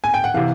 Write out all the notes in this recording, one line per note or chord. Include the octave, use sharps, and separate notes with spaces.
G#5
G5
F#5
C3 E3 F5